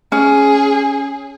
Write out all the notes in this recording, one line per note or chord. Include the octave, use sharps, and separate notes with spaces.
C#4 G#4